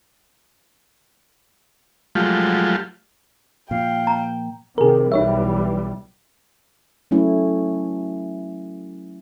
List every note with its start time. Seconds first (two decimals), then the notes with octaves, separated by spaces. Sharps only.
2.15 F3 F#3 G#3 A3 F4 G4
3.71 A#2 F3 F5 G5
4.07 A#5
4.78 C3 D#3 G#4 A#4
5.12 B1 E3 G3 D#4 C#5 E5
7.11 F#3 A3 C#4 E4